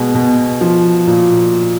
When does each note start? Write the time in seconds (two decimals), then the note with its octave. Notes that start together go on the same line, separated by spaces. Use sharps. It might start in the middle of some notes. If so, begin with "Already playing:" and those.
Already playing: B2 G#3
0.15 B2
0.61 F3
1.07 A#2